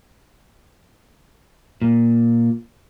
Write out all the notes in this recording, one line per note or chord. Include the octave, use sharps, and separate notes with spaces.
A#2